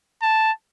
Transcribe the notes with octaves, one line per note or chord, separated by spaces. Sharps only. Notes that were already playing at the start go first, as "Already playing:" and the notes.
A5